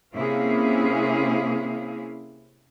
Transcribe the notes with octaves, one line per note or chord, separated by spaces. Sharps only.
C3 A#3 C#4 E4 G#4 F5